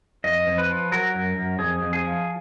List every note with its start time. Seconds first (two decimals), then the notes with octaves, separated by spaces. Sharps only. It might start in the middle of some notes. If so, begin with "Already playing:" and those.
0.24 F2 D#5
0.47 F2
0.58 B4
0.69 F3
0.92 F#3 A#4
1.14 F#2
1.36 F#2
1.59 F2 G#4
1.82 F2
1.93 G#4
2.04 F3